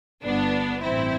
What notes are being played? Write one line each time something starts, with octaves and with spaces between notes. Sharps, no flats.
G1 G2 D3 B3 D4
A1 G2 E3 C4 E4